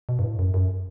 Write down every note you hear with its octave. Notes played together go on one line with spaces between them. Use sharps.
B2
G2
A2
F#2
F#2